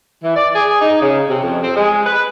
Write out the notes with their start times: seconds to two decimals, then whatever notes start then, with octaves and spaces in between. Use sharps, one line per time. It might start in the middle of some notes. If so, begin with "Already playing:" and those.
0.24 E3
0.36 D5
0.55 G#4
0.81 D#4
1.02 C#3
1.30 C3
1.43 F2
1.63 C4
1.76 G#3
2.06 B4